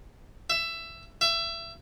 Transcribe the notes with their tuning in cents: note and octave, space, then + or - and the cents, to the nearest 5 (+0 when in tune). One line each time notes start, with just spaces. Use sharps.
E5 +15
E5 +25